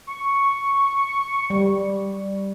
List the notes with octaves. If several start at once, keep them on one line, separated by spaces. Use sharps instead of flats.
C#6
G3